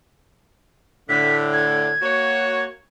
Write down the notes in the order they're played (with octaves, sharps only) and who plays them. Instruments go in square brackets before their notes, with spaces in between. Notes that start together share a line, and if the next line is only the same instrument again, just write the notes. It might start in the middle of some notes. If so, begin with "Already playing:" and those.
[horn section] A2 D3 [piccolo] B6
[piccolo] G#6
[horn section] A#3 F#4 C#5